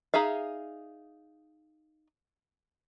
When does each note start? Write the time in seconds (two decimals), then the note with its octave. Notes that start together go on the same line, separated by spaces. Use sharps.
0.14 D#4 G#4 E5 F5